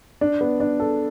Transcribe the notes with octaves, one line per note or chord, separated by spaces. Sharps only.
D4
B3
D4
A4